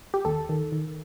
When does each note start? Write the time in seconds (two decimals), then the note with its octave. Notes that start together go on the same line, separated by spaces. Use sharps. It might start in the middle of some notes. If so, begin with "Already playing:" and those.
0.14 G4
0.25 D#2 A4
0.49 D#3
0.72 D#3